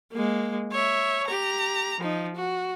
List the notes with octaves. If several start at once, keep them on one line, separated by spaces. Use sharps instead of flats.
G#3 A#3
C#5 E5
G4 A#5
F3 D#4
F#4